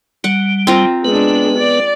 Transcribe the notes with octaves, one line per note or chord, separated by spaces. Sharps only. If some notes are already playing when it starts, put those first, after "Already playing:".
G3 F#5
C4 F4 A#4
G#3 B3 D4 B4
D5